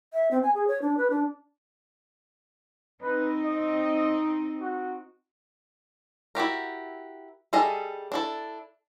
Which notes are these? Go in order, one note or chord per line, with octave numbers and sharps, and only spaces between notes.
E5
C4
G#5
G#4
C#5
D4
B4
D4
C4 D#4 B4
D#5
F#4
E4 F#4 G4 A#4
G3 G#4 A4 D#5 E5
D4 E4 A4